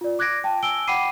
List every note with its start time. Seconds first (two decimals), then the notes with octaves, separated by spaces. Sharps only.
0.01 F4 D5
0.19 D6 F#6 G#6 A#6 D7
0.44 G5 A5
0.63 G#5 E6 D7 G7
0.87 F#5 G5 B5 D6 C7 D#7